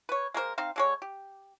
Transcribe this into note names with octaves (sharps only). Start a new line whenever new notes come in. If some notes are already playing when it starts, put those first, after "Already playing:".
B4 C#5
G#3 A#3 A#4 C5
C4 D#4 C5 F5
D3 G#3 C#5
G4